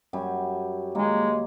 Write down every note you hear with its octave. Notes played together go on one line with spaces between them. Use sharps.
F#2 G3 G#5
D#3 G#3 A#3